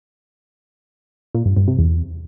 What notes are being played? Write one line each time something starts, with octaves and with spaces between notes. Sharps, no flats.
A#2
G2
G2
C3
E2